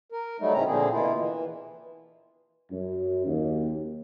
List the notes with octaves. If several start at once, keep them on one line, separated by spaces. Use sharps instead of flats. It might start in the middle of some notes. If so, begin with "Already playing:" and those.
A#4
F#3 G3 A3 D#4
A2 C#3 C4 C#4 A#5
A#2 D3 F3 A#3 C4 G#4
B2 A#3 E4 F4
E3
F#2
D#2